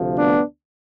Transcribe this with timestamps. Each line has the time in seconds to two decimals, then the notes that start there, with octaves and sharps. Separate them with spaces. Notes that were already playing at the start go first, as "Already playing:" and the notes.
Already playing: D2 C3 F3 A3
0.16 B3 D4